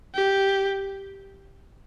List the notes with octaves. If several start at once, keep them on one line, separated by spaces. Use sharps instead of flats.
G4